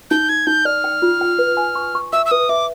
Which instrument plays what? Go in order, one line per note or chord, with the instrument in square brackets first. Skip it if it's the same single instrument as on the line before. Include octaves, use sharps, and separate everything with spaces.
[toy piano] D#4 [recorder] G6
[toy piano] D#4 [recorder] G#6
[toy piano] D#4 [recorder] G6
[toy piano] D5 [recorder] F6
[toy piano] G5
F4
G5
B4
G#5
C#6
C#6
[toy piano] E5 [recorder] E6
[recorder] E6
[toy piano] B4 [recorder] D#6
[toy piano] E5 [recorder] D6